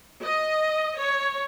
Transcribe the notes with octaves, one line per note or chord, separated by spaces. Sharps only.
D#5
C#5